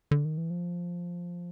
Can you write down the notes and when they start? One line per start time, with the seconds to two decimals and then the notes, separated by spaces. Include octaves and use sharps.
0.11 D3
0.25 D#3
0.38 E3
0.50 F3